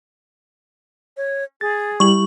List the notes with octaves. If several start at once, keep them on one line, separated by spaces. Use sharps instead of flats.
C#5
G#4 A6
G3 E4 G4 C#6 F#7